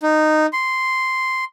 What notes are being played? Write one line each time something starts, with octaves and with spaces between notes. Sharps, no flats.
D#4
C6